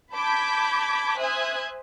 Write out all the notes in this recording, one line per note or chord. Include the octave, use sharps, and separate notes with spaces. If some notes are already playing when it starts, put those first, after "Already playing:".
A5 B5 D6 G6 G#6 B6
C5 E5 G#5 D#6 F#6 G#6